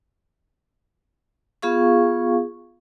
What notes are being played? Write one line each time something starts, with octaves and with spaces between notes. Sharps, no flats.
B3 F4 G#4 F5 C#6